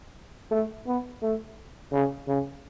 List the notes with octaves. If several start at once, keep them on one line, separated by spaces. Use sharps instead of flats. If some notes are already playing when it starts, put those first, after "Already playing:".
A3
B3
A3
C#3
C#3